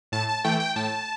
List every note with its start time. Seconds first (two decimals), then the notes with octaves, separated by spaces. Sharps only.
0.12 A2 A5
0.29 A5
0.44 E3 A3 G5
0.60 G5
0.76 A2 A5